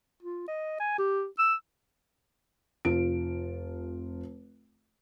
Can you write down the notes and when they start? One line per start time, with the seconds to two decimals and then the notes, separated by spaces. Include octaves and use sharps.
0.23 F4
0.48 D#5
0.80 G#5
0.99 G4
1.39 E6
2.85 F1 F4 D7